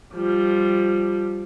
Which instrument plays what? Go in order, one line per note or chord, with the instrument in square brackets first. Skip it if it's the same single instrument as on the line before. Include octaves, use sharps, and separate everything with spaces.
[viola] F3 G3